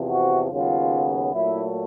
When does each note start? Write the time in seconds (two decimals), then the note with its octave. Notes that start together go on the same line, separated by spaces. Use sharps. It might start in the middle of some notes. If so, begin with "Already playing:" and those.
Already playing: E2 C3 F3
0.10 F#4
0.52 D#2 C#3 F#3 B3 F4
1.34 A#2 F#3 A3 E4